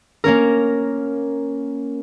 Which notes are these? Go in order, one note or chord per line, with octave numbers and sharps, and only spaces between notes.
A#3 C#4 A#4